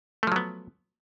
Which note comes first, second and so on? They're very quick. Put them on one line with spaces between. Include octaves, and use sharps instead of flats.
A3 F3 F#3 B3